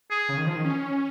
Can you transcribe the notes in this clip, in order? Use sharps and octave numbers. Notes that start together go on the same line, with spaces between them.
G#4
C#3
D#3
F3
D#3
C#4